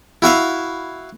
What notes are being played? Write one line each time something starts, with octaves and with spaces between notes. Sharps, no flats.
E4 F#4 E5 F5